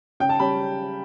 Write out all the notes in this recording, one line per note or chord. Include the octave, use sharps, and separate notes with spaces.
C#3 G5
A5
G3 C#4 B5